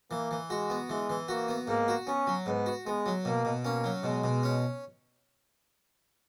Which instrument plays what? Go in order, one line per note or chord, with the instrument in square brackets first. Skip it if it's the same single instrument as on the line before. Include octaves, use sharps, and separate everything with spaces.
[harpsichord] E3 [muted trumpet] A#3
[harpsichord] E3
[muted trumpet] G#3 [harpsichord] F#4
[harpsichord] B3
[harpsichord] E3 [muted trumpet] G#3
[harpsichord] E3
[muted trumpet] A#3 [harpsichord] F#4
[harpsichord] B3
[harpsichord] G#2 [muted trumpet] A#3
[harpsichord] F#4
[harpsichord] B3 [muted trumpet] C#4
[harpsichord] F#3
[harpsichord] G#2 [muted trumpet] B3
[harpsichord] F#4
[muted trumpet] G#3 [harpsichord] B3
[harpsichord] F#3
[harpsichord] B2 [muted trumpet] A#3
[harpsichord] B2
[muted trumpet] A#3 [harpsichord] C#4
[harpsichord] F#3
[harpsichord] B2 [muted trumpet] G#3
[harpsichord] B2
C#4